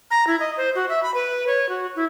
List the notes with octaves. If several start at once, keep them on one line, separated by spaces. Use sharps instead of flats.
A#5
E4
D#5
C5
F#4
E5
B5
B4
C#5
F#4
E4